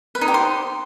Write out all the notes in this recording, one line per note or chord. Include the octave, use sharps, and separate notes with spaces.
B4
D#4
G4
C5